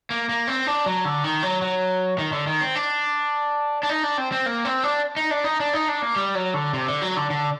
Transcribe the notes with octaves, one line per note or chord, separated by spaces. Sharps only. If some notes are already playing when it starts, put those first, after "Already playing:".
A#3
A#3
C4
D4
F#3
D3
D#3
F#3
F#3
D#3
D3
D#3
C4
D4
D4
D#4
D4
C4
C4
A#3
C4
D4
D#4
D4
D#4
D4
D#4
D4
A#3
G3
F#3
D3
C3
D3
F#3
D3
D3